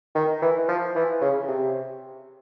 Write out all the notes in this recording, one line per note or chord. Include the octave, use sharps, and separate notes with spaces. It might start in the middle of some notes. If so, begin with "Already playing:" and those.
D#3
E3
F3
E3
C#3
C3